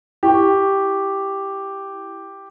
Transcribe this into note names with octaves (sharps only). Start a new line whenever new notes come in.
E4 G4 C#6